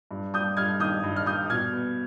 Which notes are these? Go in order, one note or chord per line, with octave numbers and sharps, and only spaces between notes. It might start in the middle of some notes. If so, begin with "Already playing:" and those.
G2
G3 D#6 G6
G2 F6 G#6
D#3 D#6 G6
G2
F6
G3 D#6 G6
B2 F6 G#6
B3